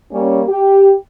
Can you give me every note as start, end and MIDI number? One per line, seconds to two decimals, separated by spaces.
0.12 0.42 55
0.12 0.42 58
0.12 0.42 61
0.48 0.93 67